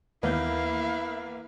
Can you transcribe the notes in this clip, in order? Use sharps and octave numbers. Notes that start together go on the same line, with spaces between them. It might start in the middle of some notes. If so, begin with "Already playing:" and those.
D#2 E3 A#3 B3 E4 F5 G6